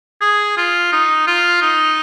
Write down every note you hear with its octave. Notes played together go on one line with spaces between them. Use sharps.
G#4
F4
D#4
F4
D#4